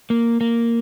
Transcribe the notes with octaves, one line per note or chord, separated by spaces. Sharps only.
A#3
A#3